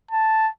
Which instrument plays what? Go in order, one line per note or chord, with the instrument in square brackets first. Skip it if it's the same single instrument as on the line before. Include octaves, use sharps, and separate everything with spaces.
[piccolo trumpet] A5